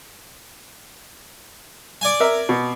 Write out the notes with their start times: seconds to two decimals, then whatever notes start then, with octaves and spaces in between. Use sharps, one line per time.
2.01 D5 G#5
2.20 A#4 E5
2.49 B2